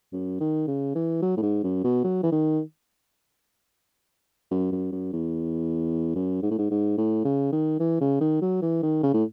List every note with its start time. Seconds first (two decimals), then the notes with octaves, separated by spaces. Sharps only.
0.12 F#2
0.40 D#3
0.67 C#3
0.95 E3
1.22 F#3
1.37 A2
1.42 G#2
1.63 F#2
1.84 B2
2.04 F#3
2.23 E3
2.32 D#3
4.51 F#2
4.72 F#2
4.92 F#2
5.13 E2
6.15 F#2
6.43 G#2
6.51 A2
6.58 G#2
6.70 G#2
6.97 A2
7.25 C#3
7.52 D#3
7.80 E3
8.01 C#3
8.21 D#3
8.42 F#3
8.62 E3
8.83 D#3
9.03 C#3
9.14 A2